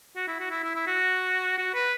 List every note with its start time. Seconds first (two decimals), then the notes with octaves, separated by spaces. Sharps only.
0.16 F#4
0.27 E4
0.40 F#4
0.51 E4
0.63 E4
0.75 E4
0.87 F#4
1.58 F#4
1.74 B4